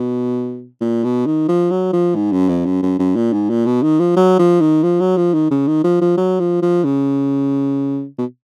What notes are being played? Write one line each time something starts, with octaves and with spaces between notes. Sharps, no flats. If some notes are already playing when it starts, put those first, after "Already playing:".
Already playing: B2
A#2
B2
D#3
F3
F#3
F3
G#2
F#2
F2
F#2
F#2
F#2
A#2
G#2
A#2
B2
D#3
F3
F#3
F3
D#3
F3
F#3
F3
D#3
C#3
D#3
F3
F3
F#3
F3
F3
C#3
B2